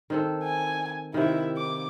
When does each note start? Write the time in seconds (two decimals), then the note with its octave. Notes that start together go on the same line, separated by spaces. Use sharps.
0.10 D#3 C4 A4
0.44 G#5
1.14 C3 D#3 E4 E5
1.57 D6